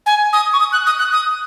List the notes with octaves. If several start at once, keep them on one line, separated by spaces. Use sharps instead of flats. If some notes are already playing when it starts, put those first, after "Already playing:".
G#5
D#6
C#6
D#6
F#6
D#6
F#6
D#6